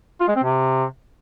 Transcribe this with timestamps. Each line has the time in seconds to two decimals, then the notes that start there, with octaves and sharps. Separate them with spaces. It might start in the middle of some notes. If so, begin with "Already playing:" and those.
0.21 F4
0.28 G#3
0.36 C4
0.43 C3